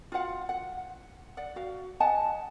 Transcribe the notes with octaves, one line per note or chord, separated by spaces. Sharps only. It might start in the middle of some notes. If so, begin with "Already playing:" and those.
F4 F#4 F5 F#5
F#5
D5 F#5
F#4 F5
D#5 F#5 G#5 A5